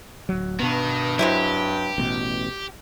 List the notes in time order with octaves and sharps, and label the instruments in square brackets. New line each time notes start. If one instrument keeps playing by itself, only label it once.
[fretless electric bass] D1 F#3
[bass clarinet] G2 [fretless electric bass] B2 B3 [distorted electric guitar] D#3
[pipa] C3 G#3 E4 [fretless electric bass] F#3 [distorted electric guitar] G4
[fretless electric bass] A1 B2